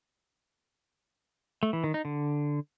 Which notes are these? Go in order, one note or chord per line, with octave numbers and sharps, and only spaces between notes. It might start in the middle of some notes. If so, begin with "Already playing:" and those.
A3
E3
D#3
D#4
D3